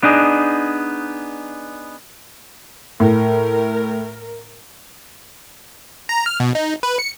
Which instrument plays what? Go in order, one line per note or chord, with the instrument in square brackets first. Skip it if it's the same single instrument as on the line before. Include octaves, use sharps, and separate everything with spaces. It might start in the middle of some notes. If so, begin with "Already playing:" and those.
[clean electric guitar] B3 D4 D#4 G#4
[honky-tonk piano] A2 [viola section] A#4
[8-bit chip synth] A#5
F6
B2
D#4
B4
C#7